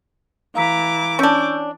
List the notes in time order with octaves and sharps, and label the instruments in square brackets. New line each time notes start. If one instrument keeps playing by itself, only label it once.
[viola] E3 D6 [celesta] F5 A#5 B6
[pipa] C#4 D4 [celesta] C#6 E6 G6